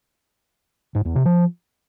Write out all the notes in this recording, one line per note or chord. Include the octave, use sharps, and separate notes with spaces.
G#2
E2
C3
F3